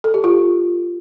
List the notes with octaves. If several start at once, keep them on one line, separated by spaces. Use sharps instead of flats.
A4
G4
F4